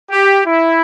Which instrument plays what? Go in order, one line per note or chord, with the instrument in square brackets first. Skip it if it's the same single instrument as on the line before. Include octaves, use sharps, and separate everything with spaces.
[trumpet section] G4
E4